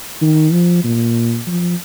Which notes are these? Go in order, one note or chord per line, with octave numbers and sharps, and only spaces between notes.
D#3
F3
A#2
F3